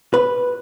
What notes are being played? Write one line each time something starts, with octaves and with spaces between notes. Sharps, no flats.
B4